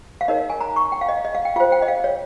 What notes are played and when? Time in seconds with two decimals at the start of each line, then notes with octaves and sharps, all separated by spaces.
0.21 F5
0.28 D#4 A#4 C#5 D#5
0.50 G#5
0.61 A#5
0.76 C#6
0.92 G5
1.01 F5
1.09 D#5
1.25 D#5
1.35 F5
1.45 G5
1.56 F4 C5 F5
1.72 G5
1.82 D#5
1.88 F5
2.04 C#5